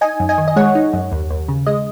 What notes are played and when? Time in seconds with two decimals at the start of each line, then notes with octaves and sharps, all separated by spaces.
0.01 D#4 D#5 G#5
0.20 F#2
0.29 D#5 G#5
0.38 D#3
0.48 D#5
0.56 G#3 C#5 F#5
0.75 D#4
0.93 F#2
1.12 D#2
1.30 D#2
1.48 C#3
1.66 G#3 D#5